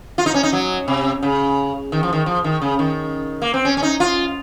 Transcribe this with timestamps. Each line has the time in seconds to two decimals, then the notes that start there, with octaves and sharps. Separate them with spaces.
0.18 F4
0.26 D#4
0.34 C#4
0.43 D#4
0.53 F#3
0.88 C3
1.23 C#3
1.92 D#3
2.03 F3
2.13 D#3
2.26 F3
2.44 D#3
2.62 C#3
2.79 D#3
3.42 A#3
3.54 C4
3.65 C#4
3.77 C#4
3.83 D#4
4.00 F4